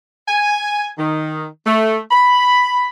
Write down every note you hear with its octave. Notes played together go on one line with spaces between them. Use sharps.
G#5
D#3
A3
B5